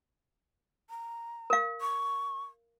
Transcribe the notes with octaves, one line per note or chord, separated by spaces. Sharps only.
A#5
A#4 F5
C#6